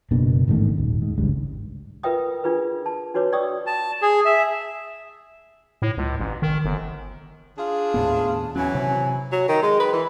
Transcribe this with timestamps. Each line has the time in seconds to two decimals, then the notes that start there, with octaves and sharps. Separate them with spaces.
0.11 F#1 B2 A#3 D4
0.48 A1 G#2 D#3 A3
0.78 D#1
1.02 G#2
1.18 G#1 C#2 G2
2.03 F4 A#4 B4 E5 G5 D#6
2.44 D4 F4 G#4 B4
2.86 A5
3.14 D4 F#4 B4 C#5 D6
3.32 D5 G5 C#6 D#6 E6
3.67 A5
4.02 G#4
4.25 E5
5.82 A2
5.98 C#2
6.20 A1
6.42 D#3
6.65 G1
7.57 D4 F4 G#4
7.94 D#2 A2 B3 A5
8.56 E3 F#3 C#4 G#5
8.75 C3
9.32 F#3
9.49 D#3
9.62 G#3
9.80 B4
9.93 E3